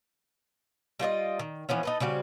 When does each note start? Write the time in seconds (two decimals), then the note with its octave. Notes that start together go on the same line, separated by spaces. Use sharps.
0.99 G3 F4 F#4 D#5
1.39 D#3
1.69 E3 F3 B3 C#4
1.83 D#4 A4 B4
2.00 C#3 G3 C4 F#4